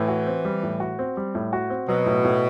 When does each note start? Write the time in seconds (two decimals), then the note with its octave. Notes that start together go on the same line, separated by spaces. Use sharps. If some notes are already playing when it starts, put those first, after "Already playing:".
Already playing: A2 E3
0.08 F#4
0.27 C4
0.45 G3
0.63 A2
0.80 F#4
0.99 C4
1.17 G3
1.35 A2
1.53 F#4
1.70 C4
1.88 B2 F#3
2.06 A2
2.25 A2